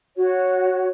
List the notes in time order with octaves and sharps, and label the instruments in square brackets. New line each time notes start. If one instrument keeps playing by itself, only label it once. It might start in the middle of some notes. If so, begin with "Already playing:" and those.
[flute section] F#4 C#5